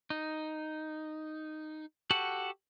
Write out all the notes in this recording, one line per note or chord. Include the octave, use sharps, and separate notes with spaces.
D#4
F#4 G4 A4 F#5